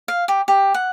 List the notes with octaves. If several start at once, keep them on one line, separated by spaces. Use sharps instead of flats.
F5
G4
G4
F#5